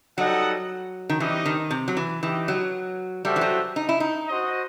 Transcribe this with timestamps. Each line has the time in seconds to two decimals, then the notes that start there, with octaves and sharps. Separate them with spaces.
0.18 F#3 G3 D#4 A4 D#5 F#5
1.09 D#3
1.20 E3 G3 C4 D#4 G4 D#5
1.46 D#3
1.71 C3
1.88 F#3
1.97 E3
2.22 E3 D#4 G4 D#5 G5
2.48 F#3
3.24 G3 F#4 A4 C5 E5 G5
3.36 E3
3.41 F#3
3.76 D#4
3.89 E4
4.00 D#4
4.27 F#4 C5 D#5